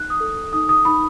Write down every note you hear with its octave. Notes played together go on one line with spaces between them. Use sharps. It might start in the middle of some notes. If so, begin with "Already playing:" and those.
Already playing: D#4 F#6
D#6
A4
D#4 D#6
D#6
D#4 B5